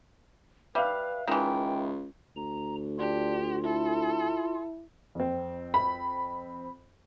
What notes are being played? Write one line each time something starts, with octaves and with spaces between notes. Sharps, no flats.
G3 B4 E5 F5
C#2 D#3 E3 G5
D2 A#5
D4 F4 G4
E4 A4
F2 C4
B5